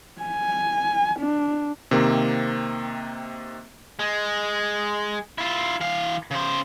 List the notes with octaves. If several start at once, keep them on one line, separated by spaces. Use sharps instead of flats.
G#5
D4
C3 D#3 A#3 C4
G#3
E4 F4
E3 F5
C#3 C5